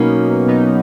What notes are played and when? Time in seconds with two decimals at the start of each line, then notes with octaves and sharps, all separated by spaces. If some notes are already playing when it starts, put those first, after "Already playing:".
Already playing: B2 F#3 A#3 B3 C#4 D#4
0.46 B2 F#3 B3 D#4